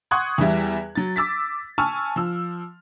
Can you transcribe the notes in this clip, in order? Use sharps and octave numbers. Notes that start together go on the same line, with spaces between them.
F#5 C6 C#6 D#6 F#6 G#6
E2 E3 G3 E5
F#3 A6
D6 E6 A6 B6
G#5 A5 C#6 E6 F6
F3 E6